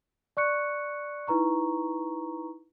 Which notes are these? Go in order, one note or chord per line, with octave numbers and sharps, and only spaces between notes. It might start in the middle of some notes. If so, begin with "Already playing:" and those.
D5 C#6 F#6 C#7
D#4 E4 B4 A#5 C#6